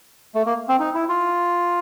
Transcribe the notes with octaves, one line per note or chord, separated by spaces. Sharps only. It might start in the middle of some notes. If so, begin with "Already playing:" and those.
A3
A#3
C4
D#4
E4
F4